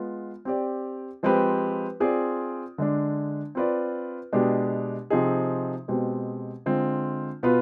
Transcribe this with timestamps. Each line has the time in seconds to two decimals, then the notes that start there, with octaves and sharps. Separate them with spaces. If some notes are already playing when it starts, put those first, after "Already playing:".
Already playing: G#3 B3 F4
0.45 C4 G4 D5
1.23 F3 G#3 C4 G4 B4
2.00 C4 F4 G#4 D5
2.78 D3 G#3 D4
3.55 C4 F4 B4 D5
4.33 B2 G#3 D4 G4
5.10 C3 F3 C4 D#4 G#4
5.88 B2 G#3 C4 G4
6.66 D3 G#3 C4 F4
7.43 B2 B3 F4 B4